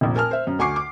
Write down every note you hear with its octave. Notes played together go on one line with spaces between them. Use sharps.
F1 A#1
A#4 G#5 A5 F6
C5 E5
F#2
D2 G#5 C#6 D6 C7
D6